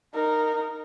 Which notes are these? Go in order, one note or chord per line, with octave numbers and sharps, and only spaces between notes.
D#4 A#4